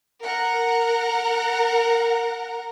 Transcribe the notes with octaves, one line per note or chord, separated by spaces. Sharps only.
A#4 F#5 A#5